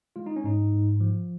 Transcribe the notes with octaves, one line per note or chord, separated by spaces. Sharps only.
G#3 F4
D#4
C#4
G#2 D#4
G#2
F3